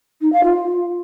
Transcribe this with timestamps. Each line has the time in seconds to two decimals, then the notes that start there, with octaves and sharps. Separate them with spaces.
0.21 D#4
0.32 F5
0.43 F4